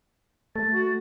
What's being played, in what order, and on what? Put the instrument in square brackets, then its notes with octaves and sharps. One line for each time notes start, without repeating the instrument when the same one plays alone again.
[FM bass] A3 [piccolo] A6
[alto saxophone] F#4